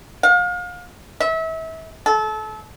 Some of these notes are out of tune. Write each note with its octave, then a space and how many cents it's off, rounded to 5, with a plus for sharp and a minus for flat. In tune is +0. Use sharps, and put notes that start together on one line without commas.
F5 +35
E5 -30
A4 -30